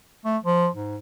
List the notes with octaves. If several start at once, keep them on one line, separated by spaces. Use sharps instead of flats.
A3
F3
G#2